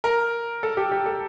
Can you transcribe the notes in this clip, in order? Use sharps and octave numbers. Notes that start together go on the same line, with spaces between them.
A#4
A4
G4
G4
A4